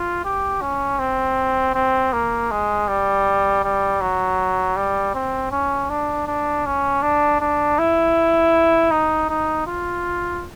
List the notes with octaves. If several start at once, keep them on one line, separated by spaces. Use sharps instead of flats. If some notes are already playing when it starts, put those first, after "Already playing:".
Already playing: F4
G4
C#4
C4
C4
A#3
G#3
G3
G3
F#3
G3
C4
C#4
D4
D4
C#4
D4
D4
E4
D#4
D#4
F4